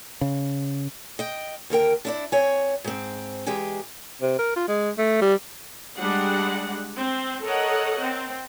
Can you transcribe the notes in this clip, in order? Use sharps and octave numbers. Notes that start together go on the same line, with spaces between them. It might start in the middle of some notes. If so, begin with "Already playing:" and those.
C#3
D#5 G5
D#2 D3 A#4 G5
D4 E4 D5
C4 C#5 G#5
G#2 C4
E2 G#3 G4 G5 G#5
C3
A#4
F4
G#3
A3
G3
G3 G#3 D4 F#5
C4
A4 A#4 C#5 D#5 F#5
C4